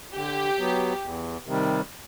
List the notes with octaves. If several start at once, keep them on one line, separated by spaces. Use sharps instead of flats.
D3 G4
F#3 B3
E2
C3 D#3 G3